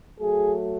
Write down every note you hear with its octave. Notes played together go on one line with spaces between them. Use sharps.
F#3 A3 G#4